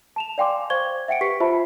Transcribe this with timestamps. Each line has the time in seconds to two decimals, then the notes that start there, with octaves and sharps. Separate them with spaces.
0.16 A5 E7 F7
0.38 D5 F5 G5 G#5 C6 D6
0.70 C5 F5 C#6 G#6 G7
1.08 E5 F#5 G5 C#7 D7
1.21 G4 B4 C#6 B6 C7
1.40 F4 C5 E5 A5 B5